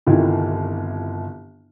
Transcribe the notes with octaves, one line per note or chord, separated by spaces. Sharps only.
G1 C2 D#3 E4 F4